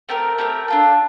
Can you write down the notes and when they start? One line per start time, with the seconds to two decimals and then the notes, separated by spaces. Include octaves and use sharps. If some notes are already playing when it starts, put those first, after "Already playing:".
0.09 A3 C4 G4 A#4
0.38 A3 C4 G4 A#4
0.68 D4 F4 A4